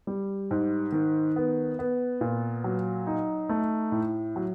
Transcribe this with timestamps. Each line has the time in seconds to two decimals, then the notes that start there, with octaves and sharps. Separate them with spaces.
0.07 G3
0.51 G#2
0.92 D#3
1.36 B3
1.79 B3
2.21 A#2
2.64 F#3
3.07 D#4
3.49 A3
3.92 A2
4.36 F#3